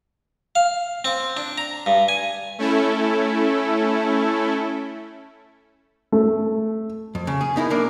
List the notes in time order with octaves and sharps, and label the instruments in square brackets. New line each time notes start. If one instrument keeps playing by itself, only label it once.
[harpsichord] F5
C4
D4
A#5
G2
G#5
[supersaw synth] A3 C#4 E4 A4
[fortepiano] A3
[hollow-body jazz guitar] F2
C#3
G#4
B3 D#4 E4 A#4
B1 A#3 D4 A#4